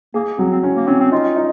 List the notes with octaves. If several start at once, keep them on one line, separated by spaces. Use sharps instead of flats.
A#3 G#4
F#3 C4
C4
C#4
A#3
C4 C#4
C4
D#4 F4
D#4